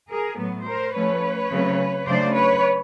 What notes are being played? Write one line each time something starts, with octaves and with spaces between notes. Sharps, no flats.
G#4 A#4
A2 F#3 B3
A#4 C5
F3 A3 C#4 B4 C#5
C#3 F#3 A3 C4
C#3 F#3 A3 D4 C5 D5
B4 C#5